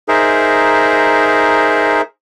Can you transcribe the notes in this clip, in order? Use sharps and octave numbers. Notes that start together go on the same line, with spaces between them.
D#4 G#4 A#4 C5 E5